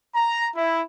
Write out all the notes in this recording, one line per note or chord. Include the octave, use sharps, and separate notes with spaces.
A#5
E4